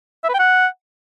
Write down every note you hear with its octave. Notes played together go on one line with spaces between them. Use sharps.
E5
B4
G5
F#5